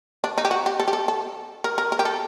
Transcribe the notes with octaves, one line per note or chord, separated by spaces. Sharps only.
D4
D#4
G4
F#4
G4
A4
G4
A4
A4
A#4
A#4
A#4
G4
A4